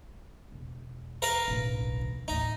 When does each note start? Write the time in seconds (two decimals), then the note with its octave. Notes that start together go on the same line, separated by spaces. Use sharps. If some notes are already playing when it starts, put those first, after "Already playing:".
0.52 E1
1.22 A#4 B4 F5
1.48 D1 B1
2.28 D#2 A2 D#4